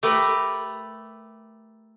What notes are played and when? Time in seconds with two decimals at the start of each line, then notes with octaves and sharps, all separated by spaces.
0.03 A3 G4 A#4 B4